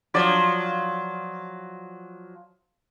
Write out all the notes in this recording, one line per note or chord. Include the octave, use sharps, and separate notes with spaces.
F3 F#3 D5